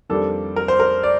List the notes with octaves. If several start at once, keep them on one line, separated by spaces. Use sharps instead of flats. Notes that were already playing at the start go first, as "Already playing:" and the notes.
F2 D#3 G3 A#3 D4 A4
A#4
C5
A#4
D5